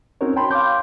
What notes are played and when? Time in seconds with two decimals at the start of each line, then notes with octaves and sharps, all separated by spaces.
0.21 C4 C#4 D#4 F#4 A#4 C#5
0.36 C#5 G5 A5 B5 C6
0.51 F5 C6 D6 G6